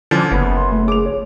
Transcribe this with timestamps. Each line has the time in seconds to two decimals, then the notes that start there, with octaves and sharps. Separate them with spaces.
0.11 D3 F3 C#4 G#6
0.31 F#1 B3 B5
0.56 C6
0.72 A3
0.88 G#4 D6 F7
1.06 C#5